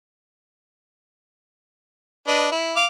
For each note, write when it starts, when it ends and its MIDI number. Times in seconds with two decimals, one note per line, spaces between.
2.27 2.48 62
2.27 2.48 71
2.27 2.48 75
2.52 2.76 64
2.76 2.86 77
2.76 2.86 86